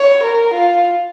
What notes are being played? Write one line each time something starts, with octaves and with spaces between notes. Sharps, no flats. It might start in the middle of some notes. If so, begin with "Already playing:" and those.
Already playing: C#5
A#4
F4